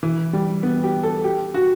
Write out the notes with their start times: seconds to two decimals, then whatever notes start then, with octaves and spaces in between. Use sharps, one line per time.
0.03 E3
0.33 G3
0.63 B3
0.84 G4
1.03 A4
1.24 G4
1.54 F#4